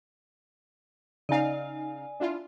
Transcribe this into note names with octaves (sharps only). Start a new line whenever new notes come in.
C#3 D#4 D5 F5 G#5
D4 E4 F4